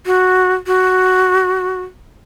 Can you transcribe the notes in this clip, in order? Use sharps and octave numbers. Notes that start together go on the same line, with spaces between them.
F#4
F#4